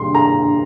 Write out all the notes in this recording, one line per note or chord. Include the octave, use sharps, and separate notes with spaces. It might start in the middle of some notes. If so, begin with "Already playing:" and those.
Already playing: C3 D#3 G3 C6
A#5